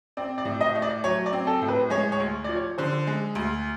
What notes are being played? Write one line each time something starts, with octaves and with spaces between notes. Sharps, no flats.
C4 D5
D5
A2
D#5
A3
D5
F#3 C#5
D5
C4
A4
A2
B4
G#3 C#5
C#5
D2
F3 D5
C#5
D3 C5
G#3
D2